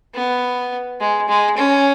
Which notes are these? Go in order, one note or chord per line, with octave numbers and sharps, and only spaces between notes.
B3
G#3
G#3
C#4